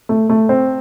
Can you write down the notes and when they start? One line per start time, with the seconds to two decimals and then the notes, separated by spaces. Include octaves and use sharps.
0.09 A3
0.29 A3
0.49 C4